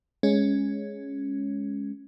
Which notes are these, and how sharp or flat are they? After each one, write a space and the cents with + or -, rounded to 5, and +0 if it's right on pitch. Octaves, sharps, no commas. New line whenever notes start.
G#3 +0 C#4 +0